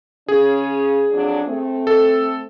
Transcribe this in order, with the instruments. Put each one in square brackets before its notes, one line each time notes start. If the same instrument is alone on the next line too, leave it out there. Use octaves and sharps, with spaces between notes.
[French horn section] C#3 C#4 [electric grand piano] G#4
[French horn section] F2 F#3 D4
A3 C4
[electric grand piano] A4